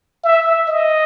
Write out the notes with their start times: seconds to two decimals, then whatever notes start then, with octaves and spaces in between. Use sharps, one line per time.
0.24 E5
0.68 D#5